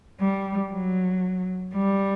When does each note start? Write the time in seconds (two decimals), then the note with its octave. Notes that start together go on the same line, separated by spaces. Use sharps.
0.21 G3
0.72 F#3
1.76 G3